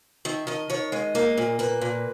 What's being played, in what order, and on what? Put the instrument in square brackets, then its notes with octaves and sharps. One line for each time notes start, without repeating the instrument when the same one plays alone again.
[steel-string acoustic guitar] D#3 E5
D#3 D#5
D#3 C#5
G#3 D#5
A#3 D#5
A#2
A#3 B4
A#2